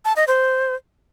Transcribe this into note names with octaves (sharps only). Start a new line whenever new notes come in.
A5
D#5
C5